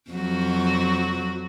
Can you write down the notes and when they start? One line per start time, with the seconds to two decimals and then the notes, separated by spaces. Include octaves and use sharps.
0.10 F2 F#3 F#4